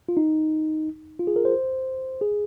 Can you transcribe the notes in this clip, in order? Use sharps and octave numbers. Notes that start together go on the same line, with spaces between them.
F4
D#4
F4
G#4
A#4
C5
G#4